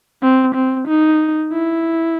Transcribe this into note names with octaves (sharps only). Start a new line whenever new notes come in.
C4
C4
D#4
E4